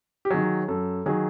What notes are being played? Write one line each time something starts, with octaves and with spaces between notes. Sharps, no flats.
G4
D#3 F#3 G#4
F#2 A4
D#3 F#3 G#4